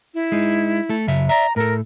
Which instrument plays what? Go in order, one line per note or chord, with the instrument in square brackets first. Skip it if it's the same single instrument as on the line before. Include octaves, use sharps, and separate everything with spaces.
[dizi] E4
[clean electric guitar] G#3 D#4
A3 A4
F#2 C#3 E5
[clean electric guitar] D5 E5 [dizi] A#5
[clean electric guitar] A2 A4 [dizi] A#4